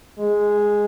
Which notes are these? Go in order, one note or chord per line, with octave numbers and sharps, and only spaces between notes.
G#3